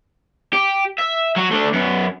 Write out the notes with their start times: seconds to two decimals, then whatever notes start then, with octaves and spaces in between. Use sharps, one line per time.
0.53 G4
0.99 E5
1.36 F#3 F#4
1.51 A3 D4
1.73 F#2 B3